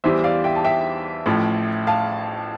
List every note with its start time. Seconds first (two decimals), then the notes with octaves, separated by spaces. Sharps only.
0.04 E2 E3 G3 C5 E5
0.24 D5 F5
0.44 E5 G5
0.55 A5
0.64 E5 G5
1.26 A1 A2 F3
1.87 F5 A5